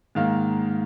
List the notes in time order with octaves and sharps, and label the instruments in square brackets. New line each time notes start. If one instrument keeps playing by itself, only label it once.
[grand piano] G#2 D#3 A#3 F5